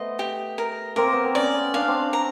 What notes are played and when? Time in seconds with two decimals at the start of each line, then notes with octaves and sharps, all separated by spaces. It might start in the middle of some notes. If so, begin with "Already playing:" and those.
Already playing: A3 B3 C5 D#5
0.19 G4
0.58 A#4
0.96 A#3 C4 A#4
1.13 B3
1.24 C4
1.35 B3 C#4 D5
1.74 D4 F5
1.81 C#4
1.88 C4 D4
2.13 A#5